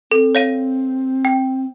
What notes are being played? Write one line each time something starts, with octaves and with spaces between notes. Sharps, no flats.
C4 A4
C#5 F5 D#7
G5